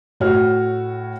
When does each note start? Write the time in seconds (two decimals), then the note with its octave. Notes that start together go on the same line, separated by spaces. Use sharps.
0.20 A2 F#4 C#5 F6